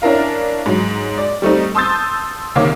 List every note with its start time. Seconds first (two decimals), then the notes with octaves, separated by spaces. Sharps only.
0.02 C#4 D4 E4 A#4 F5
0.66 G#2 F#3
1.18 D5
1.42 G3 A3 C4 D#4
1.75 A5 C6 D#6 E6 G6 A6
2.55 C2 C3 D#3 A#3 C#5 D6